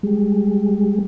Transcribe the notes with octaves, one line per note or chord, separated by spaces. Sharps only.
G3 G#3